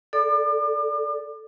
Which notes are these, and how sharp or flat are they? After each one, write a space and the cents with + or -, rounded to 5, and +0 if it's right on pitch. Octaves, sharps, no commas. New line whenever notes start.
A4 +0 D5 -5 D6 +40